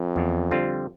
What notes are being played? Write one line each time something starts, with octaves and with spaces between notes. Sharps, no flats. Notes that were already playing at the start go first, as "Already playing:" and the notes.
Already playing: F2
E2
D3 G3 C4 F4